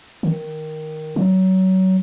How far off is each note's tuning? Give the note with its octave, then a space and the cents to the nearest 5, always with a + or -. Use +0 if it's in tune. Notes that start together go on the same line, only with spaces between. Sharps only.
D#3 +0
F#3 +25